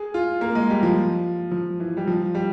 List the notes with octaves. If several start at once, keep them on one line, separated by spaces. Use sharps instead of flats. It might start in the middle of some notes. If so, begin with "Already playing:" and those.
Already playing: G#4
F4
A#3
G#3
G3
F3
F3
E3
G3
F3
G3